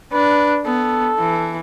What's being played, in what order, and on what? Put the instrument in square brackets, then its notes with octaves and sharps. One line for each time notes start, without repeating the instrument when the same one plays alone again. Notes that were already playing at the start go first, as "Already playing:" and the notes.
[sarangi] D4 [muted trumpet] B4
[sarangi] B3 [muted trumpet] A4
[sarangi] E3